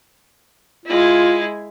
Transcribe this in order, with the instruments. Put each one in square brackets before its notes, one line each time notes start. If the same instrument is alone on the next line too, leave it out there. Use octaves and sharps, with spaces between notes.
[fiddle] G#3 E4 [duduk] F4